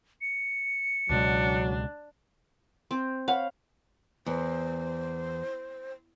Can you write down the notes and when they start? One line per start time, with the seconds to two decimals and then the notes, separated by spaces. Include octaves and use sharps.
0.21 C#7
1.10 C#2 B2 F#3 G#3 D4
2.91 C4
3.28 C#5 F5 F#5 B5
4.26 E2 C5